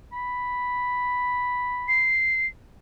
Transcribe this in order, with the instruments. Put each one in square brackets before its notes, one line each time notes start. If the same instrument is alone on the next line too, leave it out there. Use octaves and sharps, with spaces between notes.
[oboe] B5
[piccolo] C7